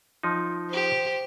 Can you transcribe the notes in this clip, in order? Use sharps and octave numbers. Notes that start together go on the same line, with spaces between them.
F3 D#4
G4 C5